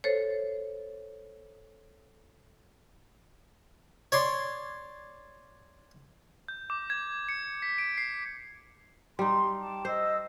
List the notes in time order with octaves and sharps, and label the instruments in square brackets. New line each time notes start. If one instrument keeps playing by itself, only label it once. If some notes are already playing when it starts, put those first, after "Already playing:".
[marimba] A4 C5 C#5
[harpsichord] C#5 D5 C6
[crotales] G6
D6
G#6
C#7
B6
D7
C7
[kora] G3 D#4 [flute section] C6
[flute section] G5 A5 D6
[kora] C5 [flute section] D#5 E6